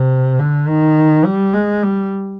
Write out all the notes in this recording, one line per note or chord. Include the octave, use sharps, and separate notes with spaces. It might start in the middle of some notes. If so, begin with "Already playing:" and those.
Already playing: C3
D3
D#3
G3
G#3
G3